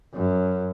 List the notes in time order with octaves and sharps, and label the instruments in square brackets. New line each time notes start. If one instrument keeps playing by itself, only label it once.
[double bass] F#2